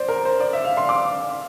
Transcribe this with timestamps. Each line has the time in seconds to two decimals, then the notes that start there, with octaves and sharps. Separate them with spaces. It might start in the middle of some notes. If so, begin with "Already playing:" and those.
Already playing: C5 D5
0.08 A#4
0.25 C5
0.40 D5
0.53 E5
0.65 F5
0.77 C6
0.89 D6